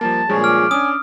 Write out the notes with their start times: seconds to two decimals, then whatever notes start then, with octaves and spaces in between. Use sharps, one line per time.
0.01 F3 G3 A#3 A5
0.29 G2 A#2 F3 G#3 G#4 C#5
0.44 D6 F6
0.71 C#4 D4 G#5 D#6